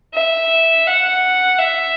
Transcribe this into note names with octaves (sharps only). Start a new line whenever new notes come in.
E5
F#5
E5